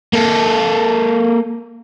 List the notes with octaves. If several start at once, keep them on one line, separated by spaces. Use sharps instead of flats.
A#3 A4